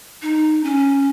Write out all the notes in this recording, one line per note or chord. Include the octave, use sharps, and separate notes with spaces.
D#4
C#4